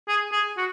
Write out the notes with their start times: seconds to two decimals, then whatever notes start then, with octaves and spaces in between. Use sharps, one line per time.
0.08 G#4
0.32 G#4
0.57 F#4